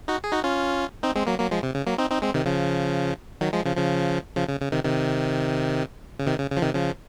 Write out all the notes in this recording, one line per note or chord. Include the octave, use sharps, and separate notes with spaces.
D#4 F#4
G#4
D#4 F#4
C#4 F4
C4 D#4
G#3 C4
F#3 A#3
F#3 A#3
F3 G#3
C3
C#3
F#3 A#3
C4 D#4
C4 D#4
G#3 C4
C3 D#3
C#3 F3
D#3 F#3
F3 G#3
C#3 F3
C#3 F3
C#3 F3
C#3
C#3
C3 D#3
C3 D#3
C#3
C3 D#3
C#3
C#3
F3
C3 D#3
C#3 F3